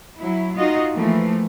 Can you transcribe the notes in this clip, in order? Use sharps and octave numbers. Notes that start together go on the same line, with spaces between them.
F#3 E4
D#4 F4 F#4 D#5
E3 F3 A3 A#3